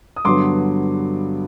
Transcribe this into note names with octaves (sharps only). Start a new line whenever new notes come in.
D#6
G2 D3 F#3 B3 C6 D6